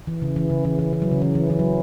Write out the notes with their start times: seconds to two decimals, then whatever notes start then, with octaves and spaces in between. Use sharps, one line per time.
0.07 E3
0.22 C#3
0.36 E3
0.50 C#3
0.65 E3
0.79 E3
0.93 E3
1.02 F#3
1.11 C#3
1.22 E3
1.35 E3
1.50 E3
1.59 F#3